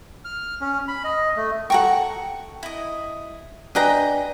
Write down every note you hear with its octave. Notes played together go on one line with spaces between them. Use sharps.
F6
C#4
B5
D#5
A3
A4 F#5 G5 A#5 C#6
E4 D#5
D4 B4 D#5 G5 G#5 A#5